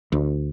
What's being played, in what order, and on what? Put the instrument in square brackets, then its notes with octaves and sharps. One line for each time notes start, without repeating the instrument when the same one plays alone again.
[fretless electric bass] D2